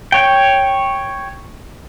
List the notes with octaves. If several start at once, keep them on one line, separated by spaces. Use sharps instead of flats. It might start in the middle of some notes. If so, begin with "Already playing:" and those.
C#5 G5